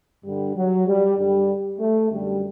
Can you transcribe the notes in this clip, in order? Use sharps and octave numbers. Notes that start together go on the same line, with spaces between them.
G2 D3 G3
F#3
G3
G2 D3 G3
A3
F#2 D3 G3